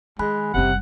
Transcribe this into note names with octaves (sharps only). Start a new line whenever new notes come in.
D#3 G#3 G#5 B5 F#6
F#1 C3 G3 F#5